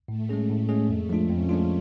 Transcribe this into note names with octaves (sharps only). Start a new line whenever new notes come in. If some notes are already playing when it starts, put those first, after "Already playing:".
A2 A3
G#3 C#4 G#4
A2 A3
G#3 C#4 G#4
F2 A3
F3 G#3 D4 F4
F2 C#4
F3 G#3 D4 F4